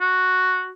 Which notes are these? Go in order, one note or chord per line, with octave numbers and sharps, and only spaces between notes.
F#4